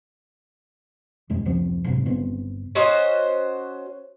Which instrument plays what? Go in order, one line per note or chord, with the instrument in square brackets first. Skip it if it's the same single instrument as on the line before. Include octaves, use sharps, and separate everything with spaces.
[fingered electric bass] E1 F#2 G#3
F1 C#2 F3 C4
F#1 G#2 C3
G1 C#3 B3 C4
[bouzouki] C#4 F#4 C5 D#5